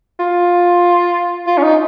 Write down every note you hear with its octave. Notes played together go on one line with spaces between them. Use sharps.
F4
F4
C#4
D#4